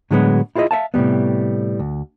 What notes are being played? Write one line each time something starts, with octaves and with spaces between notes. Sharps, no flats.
A2 D3 F#3 G#3 B3 F#4
E4 F4 G#4 C5 D#5 E5
E5 F5 A5
A2 C3 D#3 G3 B3
D2